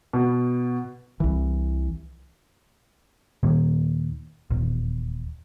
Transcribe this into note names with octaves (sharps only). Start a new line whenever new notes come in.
B2
C2 E3
D#2 A#2 D#3 A#3
D#1 E2